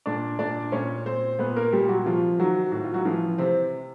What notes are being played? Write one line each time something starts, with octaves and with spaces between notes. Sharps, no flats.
A#2 D4 D5
A#2 D4 D5
A#2 C#4 C#5
A#2 C4 C5
A#2 B3 B4
A#3 A#4
A#2 G3 G4
F#3 F#4
C3 F3 F4
D#3 F#3 F#4
A2 F#4
F4
F#3 F#4
E3 F3 F4
C3 C4